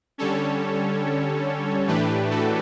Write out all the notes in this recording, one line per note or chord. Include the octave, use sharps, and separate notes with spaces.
D3 G3 C#4 A4 C#5
A2 E3 A3 D4 G4 B4
F#4 A4